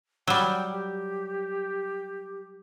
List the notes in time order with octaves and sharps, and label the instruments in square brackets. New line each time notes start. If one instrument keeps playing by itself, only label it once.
[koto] F#3 G3 [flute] G5
[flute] G4